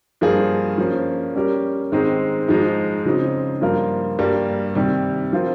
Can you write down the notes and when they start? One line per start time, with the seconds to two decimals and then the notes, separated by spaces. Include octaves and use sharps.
0.21 G2 F3 A#3 F4 G#4
0.78 F3 A#3 C#4
1.35 G3 C#4 G4 A#4
1.92 G#2 D#3 G#3 C4 D#4
2.48 G#2 F3 G#3 D#4
3.05 C#3 F3 C4 D#4
3.61 G2 F3 A#3 F4 A#4
4.19 G2 G3 A#3
4.75 C3 D#3 G3
5.33 F3 C4 F4 A#4